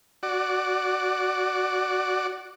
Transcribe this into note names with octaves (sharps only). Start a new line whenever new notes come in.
F#4 D5